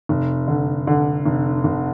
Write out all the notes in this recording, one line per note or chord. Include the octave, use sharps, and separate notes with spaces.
F1
D3
D3
F1
F1